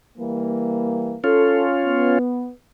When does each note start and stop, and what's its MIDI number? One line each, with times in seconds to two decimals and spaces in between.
0.18 1.16 52
0.18 1.16 55
0.18 1.16 58
1.24 2.19 61
1.24 2.19 65
1.24 1.65 69
1.86 2.51 59